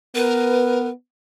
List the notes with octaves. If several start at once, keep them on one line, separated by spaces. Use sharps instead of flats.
B3 A#4 B4